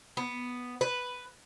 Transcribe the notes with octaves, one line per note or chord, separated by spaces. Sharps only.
B3
B4